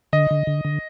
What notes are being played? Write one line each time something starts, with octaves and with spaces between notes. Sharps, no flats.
D3 D#5
D3
D3
D3